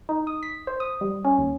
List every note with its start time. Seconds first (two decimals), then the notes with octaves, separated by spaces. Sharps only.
0.09 D#4
0.27 D#6
0.43 B6
0.67 C5
0.80 D#6
1.01 G3
1.24 C#4
1.38 D#2